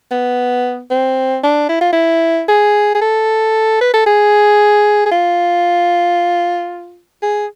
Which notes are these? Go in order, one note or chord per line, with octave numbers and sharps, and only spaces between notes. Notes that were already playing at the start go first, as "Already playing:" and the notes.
B3
C4
D4
E4
F4
E4
G#4
G#4
A4
B4
A4
G#4
G#4
F4
G#4